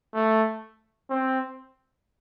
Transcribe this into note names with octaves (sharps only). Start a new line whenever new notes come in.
A3
C4